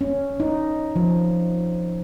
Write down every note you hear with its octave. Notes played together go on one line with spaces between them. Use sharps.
C#4
D#4
F3